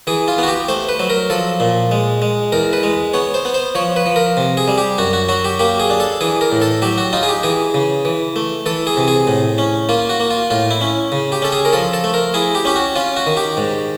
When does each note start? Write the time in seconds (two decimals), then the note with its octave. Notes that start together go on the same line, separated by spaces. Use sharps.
0.07 E3 G#4
0.28 F4
0.38 B3 F#4
0.48 G4
0.69 A3 C5
0.89 B4
1.00 F#3
1.10 A#4
1.30 F3 A4
1.60 A#2
1.91 G#3
2.22 G#3
2.52 E2 A#4
2.73 B4
2.83 G#3
3.14 B3 C#5
3.34 C5
3.45 B3
3.54 C5
3.75 F3 C#5
3.96 B4
4.06 F3
4.16 A#4
4.37 C3
4.57 G#4
4.68 G3
4.78 G4
4.98 F#2 F#4
5.13 F#4
5.29 F#3 F#4
5.44 G4
5.59 A#3 G4
5.80 G#4
5.90 D4
6.00 A4
6.21 E3 G#4
6.41 A#4
6.52 A2
6.62 A4
6.82 F#3 G4
6.98 F#4
7.13 D#4 F4
7.23 G#4
7.28 G4
7.43 E3 G#4
7.74 C#3
8.05 E3
8.36 A3
8.66 E3 A4
8.87 G#4
8.97 C3
9.08 G#4
9.27 A2
9.58 C#4
9.89 A#3 F4
10.09 F#4
10.20 A#3
10.31 F4
10.50 A2 F4
10.71 E4
10.81 C#4
11.12 C#3
11.32 G4
11.42 C#4 A4
11.52 G#4
11.65 A#4
11.73 F3 A4
11.93 A4
12.04 A3
12.14 A#4
12.34 E4 G#4
12.55 G4
12.65 C#4 G4
12.76 F#4
12.95 C#4 F4
13.16 F#4
13.27 D#3
13.37 G4
13.57 G#2